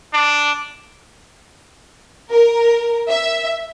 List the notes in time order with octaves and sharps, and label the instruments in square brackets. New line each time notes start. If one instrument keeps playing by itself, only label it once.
[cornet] D4
[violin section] A#4
E5